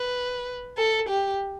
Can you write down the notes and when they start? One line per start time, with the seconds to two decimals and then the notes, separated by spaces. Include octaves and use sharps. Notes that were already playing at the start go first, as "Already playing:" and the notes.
Already playing: B4
0.78 A4
1.09 G4